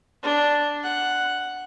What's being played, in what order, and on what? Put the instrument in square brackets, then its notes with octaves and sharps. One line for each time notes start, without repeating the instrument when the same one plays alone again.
[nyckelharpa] D4
F#5